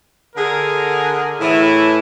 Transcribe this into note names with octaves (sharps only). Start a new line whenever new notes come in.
D3 G#4 A#4
A2 E3 E4